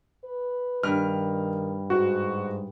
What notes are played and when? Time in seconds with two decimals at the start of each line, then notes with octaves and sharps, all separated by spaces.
0.24 B4
0.83 G2 D#3 F6
1.90 G#2 F#4